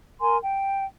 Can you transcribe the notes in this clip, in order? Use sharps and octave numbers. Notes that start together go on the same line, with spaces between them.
A#4 G#5 A#5 C6
G5